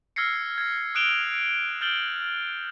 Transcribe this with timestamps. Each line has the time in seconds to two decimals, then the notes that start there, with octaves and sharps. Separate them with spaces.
0.16 E6 F6 G#6 A#6 C7 C#7
0.58 G#6 A#6
0.95 D#6 F#6 D7 E7 F7 G7
1.81 F6 G6 A6 D7 F#7 G7